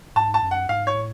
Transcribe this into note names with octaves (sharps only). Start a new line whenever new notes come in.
G#2 A5
A5
F#2
F#5
G#2 F5
C#5
A2